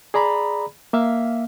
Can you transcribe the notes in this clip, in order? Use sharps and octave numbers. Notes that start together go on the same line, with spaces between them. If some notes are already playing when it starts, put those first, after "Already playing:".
G#4 D5 A#5 B5
A#3 E5 F5